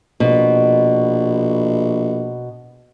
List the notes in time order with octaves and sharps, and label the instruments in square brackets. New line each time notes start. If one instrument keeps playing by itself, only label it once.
[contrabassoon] A#1 [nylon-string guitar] B2